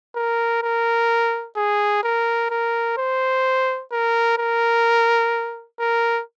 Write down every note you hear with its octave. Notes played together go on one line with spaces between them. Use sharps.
A#4
A#4
G#4
A#4
A#4
C5
A#4
A#4
A#4